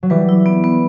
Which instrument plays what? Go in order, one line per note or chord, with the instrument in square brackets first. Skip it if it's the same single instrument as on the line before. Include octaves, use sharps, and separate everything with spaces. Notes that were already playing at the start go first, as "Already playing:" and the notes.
[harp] F#3
[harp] E3 G3 [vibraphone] B4
[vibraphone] E4
B3
B3